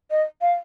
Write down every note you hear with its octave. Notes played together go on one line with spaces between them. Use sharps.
D#5
F5